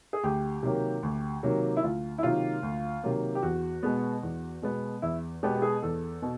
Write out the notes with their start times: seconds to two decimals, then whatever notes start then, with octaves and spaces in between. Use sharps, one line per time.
0.13 G#4
0.24 D2 G4
0.63 C3 D#3 F#3 A#3
1.03 D2
1.43 C3 D#3 F#3 A#3
1.77 E4
1.83 D2 F4
2.18 E4
2.23 C3 D#3 F#3 A#3 F4
2.63 D2
3.04 C3 D#3 F#3 A#3
3.35 G4
3.43 E2 F#4
3.83 B2 G#3 B3
4.23 E2
4.62 B2 G#3 B3
5.02 E2 E4
5.43 B2 G#3 B3 G4
5.55 G4
5.62 G#4
5.82 E2 A4
6.22 B2